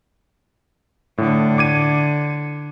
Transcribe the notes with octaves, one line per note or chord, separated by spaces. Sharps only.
A2 D3
D6 G#6 D#7